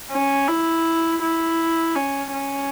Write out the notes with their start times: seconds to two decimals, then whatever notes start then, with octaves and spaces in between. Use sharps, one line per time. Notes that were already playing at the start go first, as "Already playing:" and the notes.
0.11 C#4
0.48 E4
1.22 E4
1.96 C#4
2.33 C#4